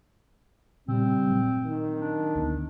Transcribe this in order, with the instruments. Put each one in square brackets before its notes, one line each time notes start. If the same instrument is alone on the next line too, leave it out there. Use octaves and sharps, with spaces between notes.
[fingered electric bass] A#2 C#3 [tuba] G3 [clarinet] C4
[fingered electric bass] A#2 F#3 A3
[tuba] D#3
[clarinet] D4
[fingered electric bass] D2 A3 B3